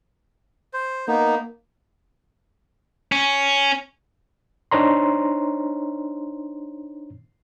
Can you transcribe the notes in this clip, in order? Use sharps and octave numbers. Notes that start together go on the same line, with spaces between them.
C5
A#3 B3 D#4
C#4
D4 D#4 C5 C#5 A#5 C6